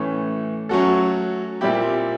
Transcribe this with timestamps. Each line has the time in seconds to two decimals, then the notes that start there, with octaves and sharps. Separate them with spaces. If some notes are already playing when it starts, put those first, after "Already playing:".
Already playing: A2 E3 A3 C#4
0.69 F#3 A3 C#4 F#4 A4
1.61 A#2 G3 C4 E4 G4